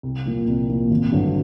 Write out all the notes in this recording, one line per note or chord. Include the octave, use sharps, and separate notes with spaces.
C2
A#2 F3 A#3
C2
A#2 F3 A#3
G#1
G2 D3 F#3